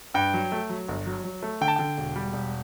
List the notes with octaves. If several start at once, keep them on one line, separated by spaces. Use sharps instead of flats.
G2 G5
F#3
A3
F#3
G1
F#3
F#3
A3
D3 G5
A5
D3 G5
E1
G3
E1